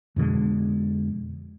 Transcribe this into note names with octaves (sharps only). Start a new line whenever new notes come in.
F2 B2 D3 G#3